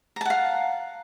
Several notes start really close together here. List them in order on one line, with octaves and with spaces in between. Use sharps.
A#5 A5 F#5 F5